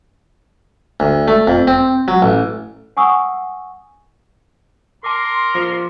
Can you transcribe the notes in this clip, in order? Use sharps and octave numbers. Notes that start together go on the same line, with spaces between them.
D2
A3
F2
C4
F#3
A1
F#5 G#5 C#6 D#6 E6
A#4 A5 C6 D6
F3